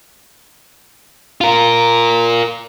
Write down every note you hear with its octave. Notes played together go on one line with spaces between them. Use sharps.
F4 A#4